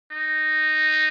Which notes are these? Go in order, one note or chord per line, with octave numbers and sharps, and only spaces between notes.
D#4